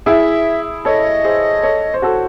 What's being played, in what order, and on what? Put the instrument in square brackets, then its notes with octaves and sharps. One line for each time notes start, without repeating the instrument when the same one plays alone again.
[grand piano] E4 G#4 [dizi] F#5
[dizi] E5
[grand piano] A4 C#5 [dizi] D#5
[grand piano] G#4 C5
A4 C#5
C5
F#4 A4